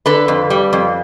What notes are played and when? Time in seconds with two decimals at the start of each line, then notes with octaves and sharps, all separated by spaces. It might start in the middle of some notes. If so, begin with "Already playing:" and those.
0.06 D3 A4 B4
0.28 F2
0.50 G3
0.73 F2